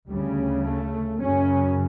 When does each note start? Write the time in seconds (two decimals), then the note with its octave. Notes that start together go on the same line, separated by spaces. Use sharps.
0.10 D2 C#3 G3
0.64 A3
1.19 F#2 C#3 C#4